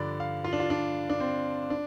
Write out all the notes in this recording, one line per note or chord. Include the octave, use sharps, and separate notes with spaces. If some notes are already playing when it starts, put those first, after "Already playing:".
Already playing: G2 D3 F3 D5
F5
F4
D4
F4
D4
D4
C4
D4